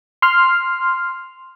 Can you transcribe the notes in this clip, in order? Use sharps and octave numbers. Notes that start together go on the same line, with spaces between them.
C6 F6